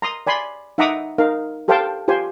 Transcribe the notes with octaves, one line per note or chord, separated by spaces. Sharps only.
A#5 C6 D#6
D5 G#5 B5 C6
D#4 E5 F#5 A#5 D6 D#6
D#4 A#4 F5
G4 A4 C5 F5 G5 A5
F4 G4 C5 G#5